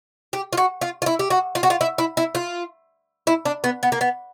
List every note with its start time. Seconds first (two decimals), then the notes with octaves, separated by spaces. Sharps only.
0.33 G4
0.53 F4
0.57 F#4
0.81 F4
1.02 F4
1.06 E4
1.19 G4
1.30 F#4
1.55 F4
1.63 F#4
1.70 F4
1.81 E4
1.98 E4
2.17 E4
2.35 F4
3.27 E4
3.45 D4
3.64 B3
3.83 B3
3.92 A#3
4.01 B3